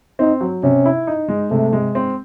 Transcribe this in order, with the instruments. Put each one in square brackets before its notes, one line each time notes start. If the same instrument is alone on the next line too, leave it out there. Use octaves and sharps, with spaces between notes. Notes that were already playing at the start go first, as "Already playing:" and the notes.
[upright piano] C4 [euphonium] D#4
[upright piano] F#3
[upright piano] C3 [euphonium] C#4
[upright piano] E4
D#4
G#3
[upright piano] C3 [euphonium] A3
[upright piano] G#3
C4